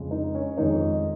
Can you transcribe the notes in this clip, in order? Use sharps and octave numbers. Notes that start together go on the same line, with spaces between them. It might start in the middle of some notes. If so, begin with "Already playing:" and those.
Already playing: F2 C#3 G#3
D#4
C#4
F2 D#3 G#3 D#4